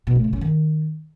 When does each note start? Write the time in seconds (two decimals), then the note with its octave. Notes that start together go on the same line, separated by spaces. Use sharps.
0.07 B2
0.15 A3
0.24 C#3
0.33 C#4
0.41 D#3